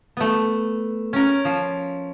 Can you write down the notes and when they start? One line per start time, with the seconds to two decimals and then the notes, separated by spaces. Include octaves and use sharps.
0.17 A3 B3
1.13 C#4 A#4
1.45 F3